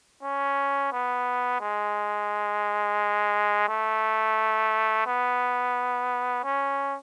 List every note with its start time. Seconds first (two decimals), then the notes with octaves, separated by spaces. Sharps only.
0.22 C#4
0.92 B3
1.60 G#3
3.68 A3
5.06 B3
6.44 C#4